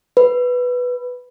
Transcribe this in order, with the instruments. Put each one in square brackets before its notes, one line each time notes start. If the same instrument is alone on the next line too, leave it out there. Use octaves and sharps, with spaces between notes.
[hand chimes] B4